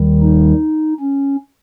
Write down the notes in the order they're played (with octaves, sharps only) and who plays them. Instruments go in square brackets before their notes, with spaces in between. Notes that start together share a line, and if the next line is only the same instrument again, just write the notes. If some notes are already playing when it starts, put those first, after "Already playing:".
Already playing: [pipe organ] D#2 D#3 G3
D#4
C#4